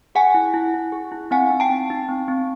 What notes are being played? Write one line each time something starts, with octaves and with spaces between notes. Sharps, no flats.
G#4 F#5 G#5
E4
E4
E4
G#4
E4
C4 F#5 G#5
D#4
G5 A5
C4
D#4
C4
C4